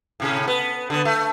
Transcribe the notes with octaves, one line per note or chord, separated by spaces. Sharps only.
A2 C3 C#4
B3
D3 B3
A3